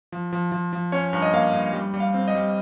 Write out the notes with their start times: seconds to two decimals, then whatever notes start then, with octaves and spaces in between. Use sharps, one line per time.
0.12 F3
0.33 F3
0.52 F3
0.73 F3
0.92 C#4 C#5
1.13 G2
1.22 D#5
1.33 A#3 F5
1.53 G2
1.73 G3
1.94 G3
2.00 F5
2.14 C4
2.28 D#5
2.35 G3